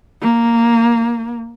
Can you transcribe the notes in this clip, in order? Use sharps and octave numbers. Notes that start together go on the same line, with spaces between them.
A#3